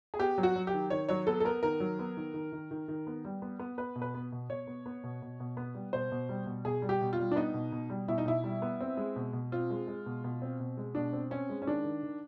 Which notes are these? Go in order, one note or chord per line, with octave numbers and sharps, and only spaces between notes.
G#4
B3 G4
F#3
F#4
F#3
G4
D#3
D#3 C#5
F#3 C#5
B3 A4
A4
B3 A#4
D#3 A#4
F#3
B3
D#3
D#3
D#3
D#3
D#3
B3
G3
B3
B3
B3 B4
B2
B4
B3
B2
B2 C#5
B3
B3
B2
B2
B2
B3
G3
B2 C5
B2
G3
B2
B2 G#4
G3
G4
B2
F4
G3
D4
B3 D#4
B2
B2
G3
B2 E4
D#4
B2 E4
G3
B3
C4
G#3
B2
B2
C4 F4
G#3
G#3
B2
B2
C4
B2
G#3
B2 D4
C4
C4 C#4
G#3
C#4
D#3 D4
D#3
D#3